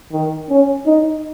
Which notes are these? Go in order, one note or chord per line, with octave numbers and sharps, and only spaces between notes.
D#3
C#4
D#4